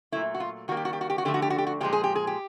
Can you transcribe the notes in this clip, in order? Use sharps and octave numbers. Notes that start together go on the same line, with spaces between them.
A#2 F#3 A3 E4
F#4
F4
D#3 G3 A#3 F#4
G4
F#4
G4
F#4
G4
F#4
D3 F3 A3 G4
F#4
G4
F#4
G4
F#4
A#2 F3 G#3 G4
G#4
G4
G#4
G4